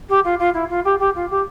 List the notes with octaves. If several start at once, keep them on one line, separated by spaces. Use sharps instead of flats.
G4
F4
F4
E4
F4
G4
G4
F4
G4